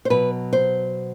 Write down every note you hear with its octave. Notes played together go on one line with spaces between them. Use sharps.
C5
B2 F#3 B4
C5